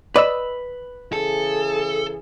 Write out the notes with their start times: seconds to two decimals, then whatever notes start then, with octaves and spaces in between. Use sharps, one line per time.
0.16 B4 D5 D#5 B5 E6
1.13 C#3 E3 G#4 A4